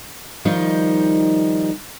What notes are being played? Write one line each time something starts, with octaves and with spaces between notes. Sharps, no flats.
D#3 F3 G3 D#4